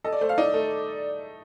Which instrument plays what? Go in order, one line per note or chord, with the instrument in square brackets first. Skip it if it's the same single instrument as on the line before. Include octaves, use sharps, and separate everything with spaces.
[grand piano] A4 [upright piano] D#5
[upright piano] D5
[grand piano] A3 [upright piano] C5
[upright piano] F5
[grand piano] D#4 [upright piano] D5
[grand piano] A3